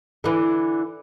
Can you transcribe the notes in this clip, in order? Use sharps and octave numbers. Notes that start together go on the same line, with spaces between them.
D3 E3